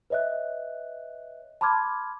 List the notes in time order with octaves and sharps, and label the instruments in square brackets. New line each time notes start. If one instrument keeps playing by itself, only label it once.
[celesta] B4 C#5 D#5 E5 F#6
A5 B5 C6 D6 F6 G#6